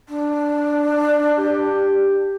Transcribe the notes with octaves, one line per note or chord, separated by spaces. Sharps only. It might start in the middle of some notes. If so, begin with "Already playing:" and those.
D4
G4